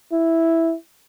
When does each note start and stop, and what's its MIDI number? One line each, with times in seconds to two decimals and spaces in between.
0.12 0.74 64